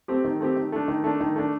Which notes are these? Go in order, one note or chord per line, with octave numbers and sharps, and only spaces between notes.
A3 C4 G4
D#3
A3 C4 G4
D#3
A3 D4
D#3
A3 D4
D#3
A3 D4